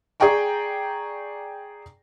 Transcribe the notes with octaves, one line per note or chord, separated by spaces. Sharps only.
G#4 D5 G5 A#5 C#6